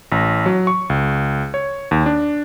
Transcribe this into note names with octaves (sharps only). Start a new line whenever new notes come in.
A1
F#3
C#6
C#2
C#5
D#2
D4